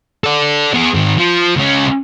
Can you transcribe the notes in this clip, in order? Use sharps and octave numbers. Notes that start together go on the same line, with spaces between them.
A4 D5
B3 G#4
G#2 D#3
F3
C#2 C#4